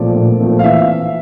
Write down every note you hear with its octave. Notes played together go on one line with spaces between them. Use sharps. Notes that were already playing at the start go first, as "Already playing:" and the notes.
Already playing: A#2 F3 A3 C4 F4 D5
A#2
F3 A3 C4 F4
F5
E3 E5